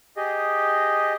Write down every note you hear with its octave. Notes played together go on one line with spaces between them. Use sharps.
G4 G#4 D#5